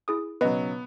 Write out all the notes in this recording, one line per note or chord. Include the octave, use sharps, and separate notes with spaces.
E4 G#4 D#6
B1 C#3 F#3 B3 B4 D#5